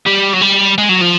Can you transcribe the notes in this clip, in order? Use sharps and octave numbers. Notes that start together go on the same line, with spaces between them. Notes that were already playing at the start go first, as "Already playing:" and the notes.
G3
F#3
G3
G#3
F#3
F3